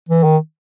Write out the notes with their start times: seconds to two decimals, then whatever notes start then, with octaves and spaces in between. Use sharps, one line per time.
0.09 E3
0.24 D#3